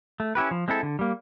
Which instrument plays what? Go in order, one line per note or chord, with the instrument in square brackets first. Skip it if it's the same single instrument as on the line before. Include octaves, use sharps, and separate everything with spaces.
[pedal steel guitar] A3
C#4 E4 G4 B4
F3
G#3 C4 E4 A4
D3
G3 A#3